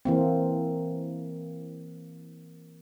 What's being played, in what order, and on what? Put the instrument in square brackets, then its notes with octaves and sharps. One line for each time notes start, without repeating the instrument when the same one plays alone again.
[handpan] E3 A#3 C4